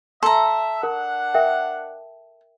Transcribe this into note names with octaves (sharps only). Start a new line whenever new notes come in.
A4 E5 A#5 C6
D4 A#4 F#5
A#4 E5 G5